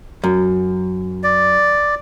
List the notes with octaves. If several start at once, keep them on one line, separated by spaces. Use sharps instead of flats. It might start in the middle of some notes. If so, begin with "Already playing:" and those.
F#2
D5